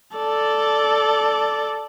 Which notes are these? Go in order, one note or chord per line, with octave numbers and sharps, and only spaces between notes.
A4 D5